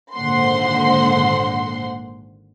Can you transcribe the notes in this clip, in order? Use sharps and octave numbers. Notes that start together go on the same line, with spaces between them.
G#1 A#2 D3 C5 F#5 C6